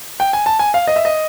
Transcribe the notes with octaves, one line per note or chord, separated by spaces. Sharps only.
G5
G#5
A5
G#5
F5
D#5
E5
D#5